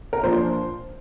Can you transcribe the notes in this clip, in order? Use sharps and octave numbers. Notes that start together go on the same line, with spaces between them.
A#4
A#2 F3 D4 C5